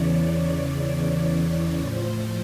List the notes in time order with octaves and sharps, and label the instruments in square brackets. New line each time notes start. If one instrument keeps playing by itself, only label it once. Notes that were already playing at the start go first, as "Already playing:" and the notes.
Already playing: [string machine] E2 C#3 E3 C#5 D5
C#5
A2 F3 C5